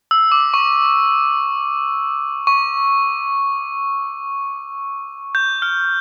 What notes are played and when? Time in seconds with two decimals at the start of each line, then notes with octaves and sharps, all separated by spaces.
0.11 E6
0.32 D6
0.54 C#6
2.47 C#6
5.35 G6
5.62 F6